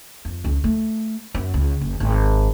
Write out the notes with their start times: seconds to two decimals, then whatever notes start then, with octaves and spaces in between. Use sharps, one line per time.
0.25 F2
0.44 C#2
0.64 A3
1.35 F#2
1.54 C#2
1.81 F#1
2.00 G#1